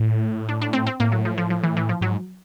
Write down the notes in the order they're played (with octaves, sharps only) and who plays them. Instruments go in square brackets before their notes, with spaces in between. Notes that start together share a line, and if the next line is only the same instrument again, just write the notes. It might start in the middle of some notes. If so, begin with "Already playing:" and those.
Already playing: [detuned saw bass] A2
[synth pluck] D4
D4
C4
C4
[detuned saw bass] A2 [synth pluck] A#3
[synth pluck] F#3
F3
F3
F3
E3
E3
F3
[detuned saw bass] G#2 [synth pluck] F#3